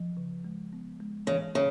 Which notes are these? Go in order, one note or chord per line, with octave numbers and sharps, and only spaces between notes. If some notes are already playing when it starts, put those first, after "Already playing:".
Already playing: F3
C#3
G#3
B3
G#3
C#3 E3
C#3